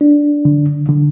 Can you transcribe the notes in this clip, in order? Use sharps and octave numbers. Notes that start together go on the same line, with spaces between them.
D4
D3
D3